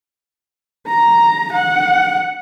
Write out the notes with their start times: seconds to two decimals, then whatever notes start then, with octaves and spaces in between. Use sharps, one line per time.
0.88 A#5
1.53 F#5